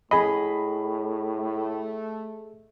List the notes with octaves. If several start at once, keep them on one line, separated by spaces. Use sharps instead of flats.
A2 G#4 D#5 B5
A3